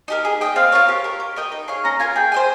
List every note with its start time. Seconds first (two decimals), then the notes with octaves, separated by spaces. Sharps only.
0.08 D#4 G4 A#4
0.25 G#4
0.41 D#5 G5
0.56 C4 F5
0.72 F4 A#4 C#5
0.88 G4
1.04 A#4 C#5
1.20 G4
1.36 A#4 D#5 G5
1.52 D#4
1.68 G#4 C#5 F5
1.85 C#4 A#5
2.00 F4 A#4 G#5
2.16 G#4 G5
2.32 C5 D#5 G#5